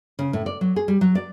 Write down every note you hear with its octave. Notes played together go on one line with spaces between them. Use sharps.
C#3
A2
D5
F#3
G#4
G3
F#3
D5